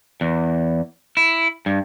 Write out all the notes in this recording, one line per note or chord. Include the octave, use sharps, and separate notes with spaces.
E2
E4
G2